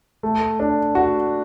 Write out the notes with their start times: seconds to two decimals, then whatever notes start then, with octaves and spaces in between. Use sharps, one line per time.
0.23 A3
0.60 D4
0.95 F#4